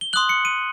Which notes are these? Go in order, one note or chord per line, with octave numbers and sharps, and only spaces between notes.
G7
C6 D#6 F#6 F#7
C#7
D#7